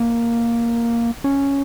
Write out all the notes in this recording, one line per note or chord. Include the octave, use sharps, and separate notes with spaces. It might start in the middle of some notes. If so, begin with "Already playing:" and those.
Already playing: A#3
C#4